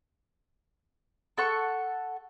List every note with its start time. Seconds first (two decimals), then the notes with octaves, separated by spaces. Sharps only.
1.38 A4 F#5 C#6